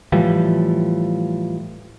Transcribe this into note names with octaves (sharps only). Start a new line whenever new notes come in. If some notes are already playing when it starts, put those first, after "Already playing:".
A2 E3 F3 G3